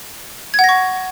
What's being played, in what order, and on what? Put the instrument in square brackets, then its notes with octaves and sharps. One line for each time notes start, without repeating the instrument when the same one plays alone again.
[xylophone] G#6
F#5
A#6
C#6